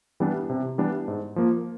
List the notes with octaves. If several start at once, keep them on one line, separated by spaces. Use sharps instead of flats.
E3 G3 B3 D4
C3
E3 G3 B3 D4
G#2
F3 A#3